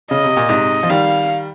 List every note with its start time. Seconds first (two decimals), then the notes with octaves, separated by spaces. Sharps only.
0.11 C#3 D#5
0.24 C3
0.37 A#2
0.49 G#2 C3
0.83 F3
0.90 D#3 G3 F5